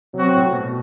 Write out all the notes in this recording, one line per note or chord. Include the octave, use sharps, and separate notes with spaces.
C3 F#3 C4 F#4
A2
B2